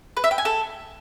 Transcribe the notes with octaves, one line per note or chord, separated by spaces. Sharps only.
B4
E5
G5
G#5
A4